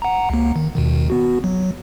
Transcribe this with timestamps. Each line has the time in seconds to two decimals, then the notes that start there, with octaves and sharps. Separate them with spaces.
0.02 F#5 A#5
0.30 C#2 A#3
0.56 D#3
0.75 D#2 B2 D#3
1.10 B3 F#4
1.44 F#3